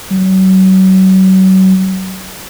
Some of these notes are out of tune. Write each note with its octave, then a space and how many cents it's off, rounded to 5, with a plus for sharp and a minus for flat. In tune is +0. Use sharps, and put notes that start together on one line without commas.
F#3 +35